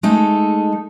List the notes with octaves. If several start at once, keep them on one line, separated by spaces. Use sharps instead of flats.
G#3 A3 D#4 A4